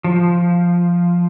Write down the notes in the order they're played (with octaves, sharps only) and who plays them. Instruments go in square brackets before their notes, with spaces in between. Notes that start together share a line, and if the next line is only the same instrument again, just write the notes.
[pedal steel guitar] F3